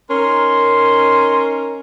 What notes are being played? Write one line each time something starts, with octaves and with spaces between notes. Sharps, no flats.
C#4 D#4 A#4 C6